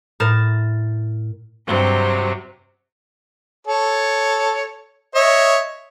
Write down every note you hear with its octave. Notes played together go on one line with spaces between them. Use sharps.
A2 A#4 A6 E7
G2 C3 F#3 C4
A4 C#5
C#5 D#5 E5